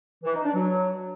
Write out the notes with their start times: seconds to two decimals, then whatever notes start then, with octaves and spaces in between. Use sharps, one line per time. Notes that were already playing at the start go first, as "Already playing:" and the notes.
0.24 E3
0.34 D#4
0.44 D4
0.54 F#3